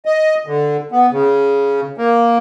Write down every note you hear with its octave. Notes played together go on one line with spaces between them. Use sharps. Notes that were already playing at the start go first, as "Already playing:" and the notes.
D#5
D3
B3
C#3
A#3